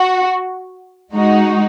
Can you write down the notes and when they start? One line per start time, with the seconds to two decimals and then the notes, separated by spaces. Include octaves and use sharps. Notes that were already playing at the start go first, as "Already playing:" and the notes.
Already playing: F#4
1.13 G#3 D#4 F#4